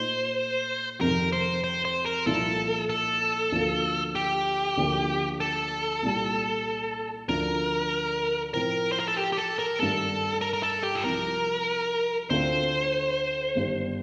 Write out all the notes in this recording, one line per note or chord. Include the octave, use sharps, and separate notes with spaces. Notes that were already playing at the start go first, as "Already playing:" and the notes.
Already playing: A#2 A3 D#4 C5
F1 F2 C3 D#3 A#4
C5
C5
C5
A#4
C2 A#2 F3 A#3 D#4 A4
A4
D2 D3 F3 A#3 F4
G4
D2 D3 F3 A#3
A4
C2 A#2 G3
D2 D3 F3 A#4
A2 F3 C4 A#4
C5
A#4
A4
G4
G4
A4
A#4
G2 D#3 A3 A4
A#4
A#4
A4
G4
A4
C2 C3 F3 A#4
D2 D3 A3 C4 F4 C5
G1 G2 D#3